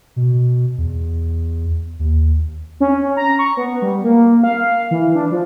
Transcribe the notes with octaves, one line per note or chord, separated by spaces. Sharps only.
B2
E2
D#2
C#4
A#5
C#6
B3
G3
A#3
F5
E3
D4
F3